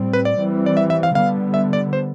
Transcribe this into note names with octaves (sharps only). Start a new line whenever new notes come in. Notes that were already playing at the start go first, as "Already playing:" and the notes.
Already playing: A2 G3 C4
B4
D5
E3 G3 C4
D5
E5
E5
F5
D3 G3 B3 F5
E5
D5
C5